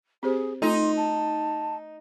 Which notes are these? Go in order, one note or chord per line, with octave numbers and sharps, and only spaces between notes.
C4 G4 G#4 C5
A3 D#4 F4 A4 C6
A5